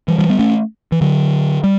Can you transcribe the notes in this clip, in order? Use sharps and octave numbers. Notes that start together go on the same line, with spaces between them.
E3 G3
E3 G3
G3 B3
A3 C#4
E3
D3 F#3
G3